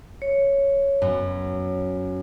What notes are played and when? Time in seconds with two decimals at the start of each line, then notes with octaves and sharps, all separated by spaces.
0.22 C#5
1.02 F#2 B3